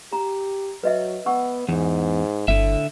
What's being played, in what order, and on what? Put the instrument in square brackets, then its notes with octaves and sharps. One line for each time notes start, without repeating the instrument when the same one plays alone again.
[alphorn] G4 [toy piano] A#5
[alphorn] F#3 [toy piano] B4 D#5 E5
[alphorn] B3 [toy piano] F#5 C#6 E6
[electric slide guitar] E2 [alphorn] G#2
[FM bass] G1 [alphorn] A2 [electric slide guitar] D3 E5